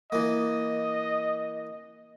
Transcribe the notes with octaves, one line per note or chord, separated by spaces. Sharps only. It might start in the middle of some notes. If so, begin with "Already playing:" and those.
E3 A#3 D#5